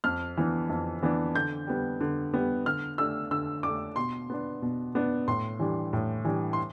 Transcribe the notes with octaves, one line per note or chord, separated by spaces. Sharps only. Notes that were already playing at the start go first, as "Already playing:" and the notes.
F2 F6
E3 B3 D4
F2
E3 B3 D4
D3 G6
G3 B3
D3
G3 B3
D3 F6
A3 D4 E6
D3 E6
A3 D4 D6
B2 C6
B3 D4
B2
B3 D4
A2 C6
E3 G3 D4
A2
E3 G3 D4
C6